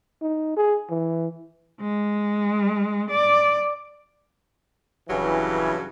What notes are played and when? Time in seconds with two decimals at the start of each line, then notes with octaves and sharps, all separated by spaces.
0.22 D#4
0.57 G#4
0.90 E3
1.81 G#3
3.11 D5
5.09 D#1 G2 C#3 E3 F#3